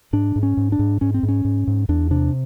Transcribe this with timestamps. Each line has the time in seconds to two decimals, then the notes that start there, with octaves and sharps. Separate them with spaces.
0.13 G#2 D4
0.36 G#2
0.43 C#4
0.57 G#2
0.72 D4
0.79 G#2
1.01 G#2 C#4
1.14 C4
1.23 G#2
1.28 C#4
1.45 G#2
1.67 G#2
1.89 E2 D4
2.11 C3 D4